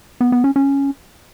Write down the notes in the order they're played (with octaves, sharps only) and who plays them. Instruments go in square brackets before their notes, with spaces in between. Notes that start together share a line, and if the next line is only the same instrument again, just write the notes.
[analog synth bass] B3
B3
C#4
C#4